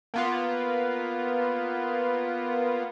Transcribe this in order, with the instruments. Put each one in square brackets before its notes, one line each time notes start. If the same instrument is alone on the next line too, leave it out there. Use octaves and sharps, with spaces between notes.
[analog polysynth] A#3 B3 F4